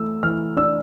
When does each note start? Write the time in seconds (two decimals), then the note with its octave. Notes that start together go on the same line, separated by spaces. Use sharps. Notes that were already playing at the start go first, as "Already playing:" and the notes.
Already playing: E3 A3 E6
0.23 E3 F6
0.57 D4 E6